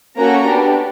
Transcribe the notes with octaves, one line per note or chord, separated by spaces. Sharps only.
A#3 C#4 F#4 A4 A#5
B3 D4 G4